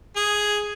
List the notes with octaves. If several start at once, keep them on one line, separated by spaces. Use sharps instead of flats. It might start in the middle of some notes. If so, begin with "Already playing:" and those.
G#4